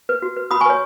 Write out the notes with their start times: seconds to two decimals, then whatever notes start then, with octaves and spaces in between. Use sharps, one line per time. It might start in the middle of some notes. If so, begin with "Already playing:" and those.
0.09 B4
0.22 F#4
0.37 B4
0.51 F#4 B5 D#6
0.61 G#5 C#6
0.66 B4 C#5